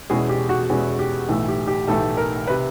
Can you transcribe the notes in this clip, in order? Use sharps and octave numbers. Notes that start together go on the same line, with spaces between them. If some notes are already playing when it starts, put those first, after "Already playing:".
E2 B2 G#3 C#4 E4 G#4
G4
F#4
E2 B2 G#3 C#4 E4
G4
B1 A2 E3 A3
G4
G4
B1 A2 E3 A3 A4
A#4
C3 B4